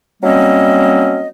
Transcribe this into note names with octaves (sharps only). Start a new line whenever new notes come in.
F#3 G3 A#3 C4 C#4 D#5